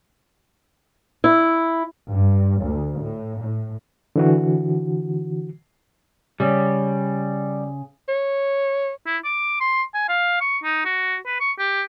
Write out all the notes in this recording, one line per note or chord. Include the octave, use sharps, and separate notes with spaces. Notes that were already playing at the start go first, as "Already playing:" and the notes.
E4
G2
D2
A2
A2
D3 E3 F#4
C#3 G3
C#5
E4
D6
C6
G#5
F5
C#6
D#4
F#4
B4
C#6
G4